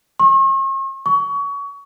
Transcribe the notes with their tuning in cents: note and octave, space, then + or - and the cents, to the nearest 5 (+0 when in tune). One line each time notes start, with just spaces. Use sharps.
C#6 -45
C#6 +25